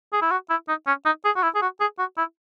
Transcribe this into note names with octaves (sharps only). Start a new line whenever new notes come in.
G#4
E4
F#4
E4
D#4
C#4
D#4
G#4
F#4
E4
G#4
F#4
G#4
F#4
E4